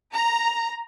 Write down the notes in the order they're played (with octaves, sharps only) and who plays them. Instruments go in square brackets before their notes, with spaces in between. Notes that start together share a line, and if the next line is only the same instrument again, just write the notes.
[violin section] A#5